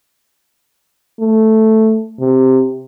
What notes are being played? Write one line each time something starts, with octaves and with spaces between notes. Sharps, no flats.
A3
C3